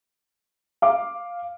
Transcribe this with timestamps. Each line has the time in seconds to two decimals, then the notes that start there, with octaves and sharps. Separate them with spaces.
0.82 F5 D6